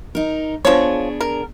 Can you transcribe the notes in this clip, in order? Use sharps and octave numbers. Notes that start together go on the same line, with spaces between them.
D#4 A#4
F3 B3 D4 G#4 C#5
A#4